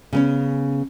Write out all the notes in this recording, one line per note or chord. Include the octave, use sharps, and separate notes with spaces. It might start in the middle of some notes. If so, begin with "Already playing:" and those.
C#3 B3 C#4